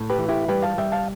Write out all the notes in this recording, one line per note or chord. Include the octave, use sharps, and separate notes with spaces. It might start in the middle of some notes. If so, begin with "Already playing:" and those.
Already playing: A2
G4 B4
E3
E4 G4
G3 G4 B4
F5 A5
G3 E5 G5
F5 A5